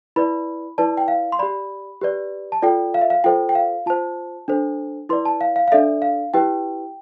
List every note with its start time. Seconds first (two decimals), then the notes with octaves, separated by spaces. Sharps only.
0.16 E4 B4 D5 B5
0.78 E4 B4 D5 A5
0.97 G5
1.08 F5
1.32 C6
1.39 G4 D5 B5
2.01 G4 B4 D5
2.52 A5
2.62 F4 A4 D5 G5
2.94 F5
3.01 E5
3.10 F5
3.24 F4 A4 C5 G5
3.49 G5
3.55 F5
3.86 F4 C5 A5
4.48 D4 A4 C5
5.09 E4 B4 D5 C6
5.25 A5
5.41 F5
5.56 F5
5.68 F5
5.72 D4 A4 D5 E5
6.02 F5
6.34 E4 G4 B4 G5